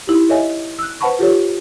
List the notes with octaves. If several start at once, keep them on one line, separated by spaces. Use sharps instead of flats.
D#4 E4 G4
A4 C#5 D#5 E5 G#5
E6 F#6
B4 C5 F#5 A5 B5 C#6
F4 G4 A4 C#5